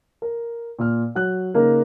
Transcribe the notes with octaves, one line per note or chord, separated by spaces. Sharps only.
A#4
A#2 F6
F#3 F#4 F#6
C#3 A#3 D#4 A#4